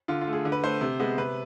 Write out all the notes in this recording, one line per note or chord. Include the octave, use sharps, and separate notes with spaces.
D3 F4
F4
A3
G#4
D3
B4
A3 C5
C3
G#3 B3
C3 B4